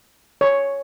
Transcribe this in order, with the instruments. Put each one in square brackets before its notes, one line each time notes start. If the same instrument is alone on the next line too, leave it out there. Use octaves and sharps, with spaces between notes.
[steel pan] C#5